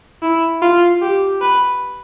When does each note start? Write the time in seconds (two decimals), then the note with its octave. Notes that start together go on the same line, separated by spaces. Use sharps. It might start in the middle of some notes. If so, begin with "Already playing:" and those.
0.22 E4
0.62 F4
1.02 G4
1.41 B4